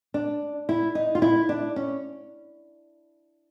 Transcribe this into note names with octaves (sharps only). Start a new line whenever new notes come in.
D4
E4
D#4
F4
E4
D4
C#4